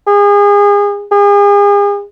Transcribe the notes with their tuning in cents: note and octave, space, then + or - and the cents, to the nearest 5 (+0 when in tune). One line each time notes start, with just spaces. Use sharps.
G#4 -30
G#4 -40